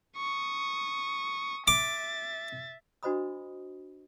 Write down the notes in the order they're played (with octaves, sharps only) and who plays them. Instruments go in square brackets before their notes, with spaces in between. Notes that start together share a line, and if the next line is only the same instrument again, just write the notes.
[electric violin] C#6 D#6
[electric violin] E5 A6 [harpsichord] D6
[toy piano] D4 F#4 C5 D#5 B5 D#6